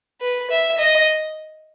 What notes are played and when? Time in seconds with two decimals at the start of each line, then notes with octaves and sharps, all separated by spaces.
0.21 B4
0.51 E5
0.78 D#5